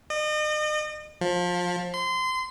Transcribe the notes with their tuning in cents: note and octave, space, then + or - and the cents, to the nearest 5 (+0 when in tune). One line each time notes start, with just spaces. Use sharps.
D#5 -40
F3 +25
C6 -25